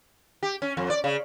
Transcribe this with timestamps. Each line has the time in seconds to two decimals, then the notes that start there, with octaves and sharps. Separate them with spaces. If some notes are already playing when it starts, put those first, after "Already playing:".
0.43 G4
0.62 C#4
0.77 F2
0.90 D5
1.04 C#3